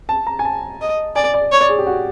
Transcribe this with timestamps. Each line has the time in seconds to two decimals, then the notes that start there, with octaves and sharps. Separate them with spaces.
0.09 A5
0.27 A#5
0.39 G#5
0.45 A5
0.81 D#5
1.16 D5 G#5
1.34 D5
1.52 C#5
1.61 D5
1.69 G#4
1.78 G4
1.87 F#4